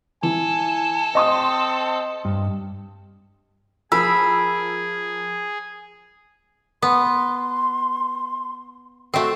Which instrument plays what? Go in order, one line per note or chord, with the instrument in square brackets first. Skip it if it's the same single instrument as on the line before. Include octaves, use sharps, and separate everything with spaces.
[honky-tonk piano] E3 [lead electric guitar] A4 [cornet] G#5
[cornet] C4 [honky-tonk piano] D#5 C6 D#6
[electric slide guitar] G2
[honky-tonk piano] F3 A#4 E6 [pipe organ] G#4 [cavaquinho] B5
[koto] B3 [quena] C6
[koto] A3 C4 [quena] F#4